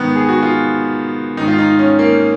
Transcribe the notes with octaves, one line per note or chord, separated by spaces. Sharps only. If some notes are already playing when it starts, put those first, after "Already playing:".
Already playing: G#2 D#3 B3
G#4
F#4
F4
G#2 D#3 D#4
F4
D#4
C#4
A#3